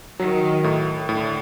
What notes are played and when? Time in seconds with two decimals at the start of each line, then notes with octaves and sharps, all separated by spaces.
0.19 D#3 F#3
0.64 A2
1.09 A2 D3